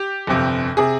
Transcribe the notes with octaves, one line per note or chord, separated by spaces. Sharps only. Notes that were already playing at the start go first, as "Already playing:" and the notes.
Already playing: G4
G1 F2 C3
C3 G#4